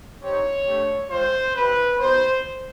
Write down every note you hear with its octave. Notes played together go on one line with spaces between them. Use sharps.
C4 D#4 G4 C#5
A3 D4 G4
G#3 C4 F4 C5
C4 E4 G4 B4
B3 D#4 F#4 C5